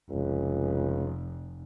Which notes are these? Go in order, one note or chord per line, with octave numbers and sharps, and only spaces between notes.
F1 C#2